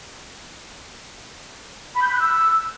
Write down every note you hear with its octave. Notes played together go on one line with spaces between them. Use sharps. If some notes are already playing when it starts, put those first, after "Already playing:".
B5
G6
B5
F#6
E6